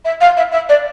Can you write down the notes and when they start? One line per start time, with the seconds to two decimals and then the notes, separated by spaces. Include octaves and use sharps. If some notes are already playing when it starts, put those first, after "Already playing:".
0.05 E5
0.21 F5
0.37 E5
0.52 E5
0.69 D5